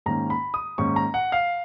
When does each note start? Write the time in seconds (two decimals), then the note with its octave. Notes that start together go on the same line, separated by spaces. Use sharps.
0.06 G#2 D#3 A#3 C#4 A#5
0.30 B5
0.54 D#6
0.78 G#2 D#3 A#3 C#4 C#6
0.96 A#5
1.14 F#5
1.32 F5